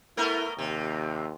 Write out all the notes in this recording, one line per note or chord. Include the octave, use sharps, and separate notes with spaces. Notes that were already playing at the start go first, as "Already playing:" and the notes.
A3 B3 E4 A#4
D#2 C3